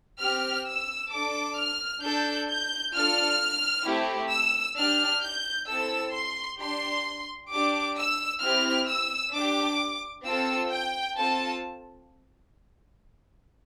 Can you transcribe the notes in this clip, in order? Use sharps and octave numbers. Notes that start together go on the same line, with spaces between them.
C4 G4 F6
E6
D4 A4 D6
F6
D4 A4 G6
G6
D4 F4 A4 F6
A3 C4 E4 G4
E6
D4 G4 F6
G6
C4 E4 A4 E6
C6
D4 G4 C6
D4 G4 D6
E6
C4 E4 G4 F6
E6
D4 G4 D6
C4 F4 A4 E6
G5
C4 F4 A4 A5